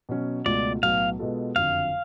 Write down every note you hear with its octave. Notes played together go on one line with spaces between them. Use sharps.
B2 F#3 C#4
C#2 B2 A3 F4 D5
B1 A2 F#3 B3 F5
B2 G#3 B3 F4 A4
F#1 F2 D3 F#3 F5